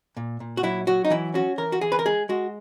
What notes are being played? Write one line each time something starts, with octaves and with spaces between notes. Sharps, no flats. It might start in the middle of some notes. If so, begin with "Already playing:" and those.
A#2
A#2
F#4
F#3 E4
F#3 F#4
D#4
E3 E4
C#4 F#4
E3 A#4
F#4
E3 G#4
B4
A#4
G#3 G#4
G#3 F#4